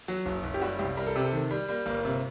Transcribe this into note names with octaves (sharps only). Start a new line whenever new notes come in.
F#3
F#1
F#1
G4
G3 F#4
C2 G4
G3 A#4
A4
C3 G4
A4
D#3
G3
G3 A#3
G1 A#3
C3